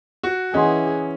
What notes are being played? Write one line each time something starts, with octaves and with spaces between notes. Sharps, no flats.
F#4
E3 C#4 G#4 D#5 F#5 C6